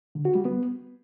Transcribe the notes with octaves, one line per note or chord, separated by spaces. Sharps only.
D3
F#4
G3
B3